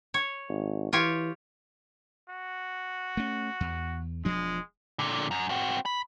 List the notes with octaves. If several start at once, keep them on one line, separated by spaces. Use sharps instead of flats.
C#5
G#1
E3 F4 G4 C#5
F#4
A3 C#4
E2
E1 F3 G#3 D4
A#2 D3
F#2
C4 F#4
B5